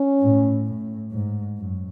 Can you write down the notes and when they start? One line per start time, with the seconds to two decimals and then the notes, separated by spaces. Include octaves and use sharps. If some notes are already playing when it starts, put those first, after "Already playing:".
Already playing: C#4
0.20 A2
0.66 A2
1.12 G#2
1.58 F#2